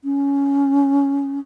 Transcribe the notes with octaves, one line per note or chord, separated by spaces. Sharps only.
C#4